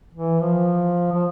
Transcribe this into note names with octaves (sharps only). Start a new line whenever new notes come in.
E3
F3
F3